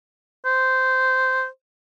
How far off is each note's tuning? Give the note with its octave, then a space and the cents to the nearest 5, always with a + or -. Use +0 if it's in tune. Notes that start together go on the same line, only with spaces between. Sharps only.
C5 -10